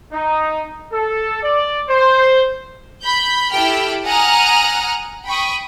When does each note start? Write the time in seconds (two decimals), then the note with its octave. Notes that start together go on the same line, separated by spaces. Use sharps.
0.13 D#4
0.92 A4
1.42 D5
1.88 C5
3.02 B5 G6
3.51 E4 G4 A4 G5 F6
4.06 F#5 G#5 A#5 D#6 F6 F#6
5.26 G5 B5 C#6 D#6